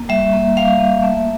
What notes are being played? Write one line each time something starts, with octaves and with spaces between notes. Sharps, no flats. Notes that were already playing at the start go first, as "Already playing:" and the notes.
Already playing: A#3
G3 E5
A#3
G3 F5
A#3
A3 E5